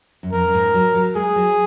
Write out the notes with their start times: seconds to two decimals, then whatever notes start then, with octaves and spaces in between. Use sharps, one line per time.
0.23 F#2
0.33 F2 A#4
0.48 F#2
0.54 G#2
0.74 F#3
0.95 F#3
1.15 G#3 G#4
1.36 F#3